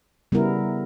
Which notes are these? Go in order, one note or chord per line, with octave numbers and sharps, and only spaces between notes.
C#3 G3 B3 E4 A#4